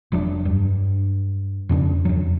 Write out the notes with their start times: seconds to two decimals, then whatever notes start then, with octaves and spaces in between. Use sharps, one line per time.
0.12 F1 F#3 C4 D4
0.45 G2
1.69 F2 C#3 C4 D4
2.05 F2 F#3